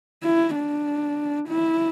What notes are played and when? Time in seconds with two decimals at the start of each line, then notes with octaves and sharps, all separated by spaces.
0.23 E4
0.55 D4
1.49 E4